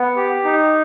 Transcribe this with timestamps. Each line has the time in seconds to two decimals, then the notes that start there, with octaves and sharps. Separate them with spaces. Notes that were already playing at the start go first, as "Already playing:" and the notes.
Already playing: B3
0.16 G4
0.45 D#4